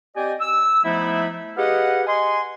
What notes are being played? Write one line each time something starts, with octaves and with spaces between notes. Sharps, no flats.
C4 G4 D5 D#5 G5 G#5
E6
F3 A3 B3 D#4 E4
G4 G#4 B4 D#5 F5 F#5
D#5 G#5 C6